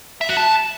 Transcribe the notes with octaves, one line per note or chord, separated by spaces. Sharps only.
E5
F#4
A5